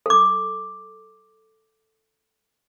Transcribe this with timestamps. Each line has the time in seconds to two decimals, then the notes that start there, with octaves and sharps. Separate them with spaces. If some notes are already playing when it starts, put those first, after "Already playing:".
0.06 A4 D6